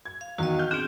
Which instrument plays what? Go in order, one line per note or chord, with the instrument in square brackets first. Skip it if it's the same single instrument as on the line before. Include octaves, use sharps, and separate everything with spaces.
[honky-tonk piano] G#6
[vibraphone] F5
[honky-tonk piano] E2 D#3 [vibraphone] F#4 D#5
[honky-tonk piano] F6 G6
[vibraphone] C4 D4 G#4 [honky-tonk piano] G6 D7